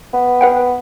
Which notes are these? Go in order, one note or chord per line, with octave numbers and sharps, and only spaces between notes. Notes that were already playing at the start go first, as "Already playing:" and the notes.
B3
B4 F#5 G5